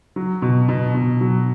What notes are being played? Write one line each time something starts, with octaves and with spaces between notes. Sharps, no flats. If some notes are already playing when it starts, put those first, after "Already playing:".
F#3
B2
B2
B2
F#3